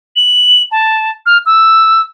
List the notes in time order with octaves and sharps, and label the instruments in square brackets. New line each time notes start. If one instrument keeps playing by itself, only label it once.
[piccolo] F#7
A5
F6
E6